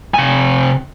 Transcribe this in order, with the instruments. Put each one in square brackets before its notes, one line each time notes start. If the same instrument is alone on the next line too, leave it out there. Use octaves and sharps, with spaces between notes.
[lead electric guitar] C3 G#5